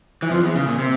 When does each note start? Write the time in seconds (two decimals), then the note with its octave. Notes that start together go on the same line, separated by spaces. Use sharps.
0.22 E3
0.31 F2 F3
0.42 E2 E3
0.55 C#3
0.67 A#2
0.79 C3